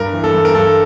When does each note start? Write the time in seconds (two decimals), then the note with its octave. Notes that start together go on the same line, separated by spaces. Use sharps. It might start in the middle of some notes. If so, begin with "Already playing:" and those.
Already playing: G2 A#4
0.13 E3
0.24 A4
0.34 G2
0.45 A#4
0.55 G2 A4